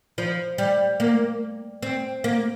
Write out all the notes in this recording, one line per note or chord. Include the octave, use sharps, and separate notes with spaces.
F3
G3
A#3
C4
A#3